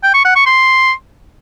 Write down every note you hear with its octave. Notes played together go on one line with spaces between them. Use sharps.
G5
C#6
F#5
C#6
C6